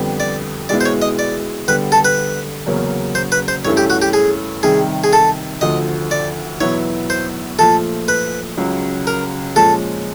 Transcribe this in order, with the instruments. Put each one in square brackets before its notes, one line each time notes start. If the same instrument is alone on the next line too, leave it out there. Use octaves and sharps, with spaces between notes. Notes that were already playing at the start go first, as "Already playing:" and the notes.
Already playing: [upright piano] F2 D3 G3 B3
[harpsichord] D5
[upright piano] B2 G#3 B3 E4 [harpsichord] D5
[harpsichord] C5
C#5
D#5
D5
[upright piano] D3 G3 B3 [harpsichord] B4
[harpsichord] A4
B4
[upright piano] E2 C#3 F#3 A#3 C#4
[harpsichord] C5
B4
C5
[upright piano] G2 E3 A3 C#4 E4 [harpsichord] C#5
[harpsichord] G4
F#4
G4
G#4
[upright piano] C3 D#3 G3 [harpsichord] G#4
[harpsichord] G#4
A4
[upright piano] D2 D3 F3 [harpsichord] D#5
[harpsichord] D5
[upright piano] E2 B2 F#3 B3 E4 [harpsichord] C#5
[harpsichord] C5
[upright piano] A#2 F3 A3 [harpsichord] A4
[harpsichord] B4
[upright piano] C#2 C#3 F#3
[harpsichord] A#4
[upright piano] A#2 F3 G#3 C#4 [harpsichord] A4